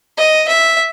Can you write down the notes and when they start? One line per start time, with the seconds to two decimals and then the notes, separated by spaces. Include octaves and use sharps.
0.18 D#5
0.48 E5